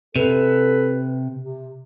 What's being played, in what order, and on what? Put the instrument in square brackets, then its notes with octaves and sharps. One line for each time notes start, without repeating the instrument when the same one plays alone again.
[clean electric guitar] C3 [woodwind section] A4 B4
[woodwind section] C3